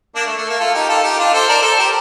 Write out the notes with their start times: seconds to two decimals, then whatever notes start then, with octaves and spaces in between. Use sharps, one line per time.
0.15 A#3 D4
0.26 A3
0.37 A3
0.49 A#3
0.59 F4 A4
0.75 D#4 G4
0.89 F4 A4
1.04 D#4 G4
1.19 D4 F4
1.33 A4 C5
1.49 A#4 D5
1.62 A4 C5
1.78 G4 A#4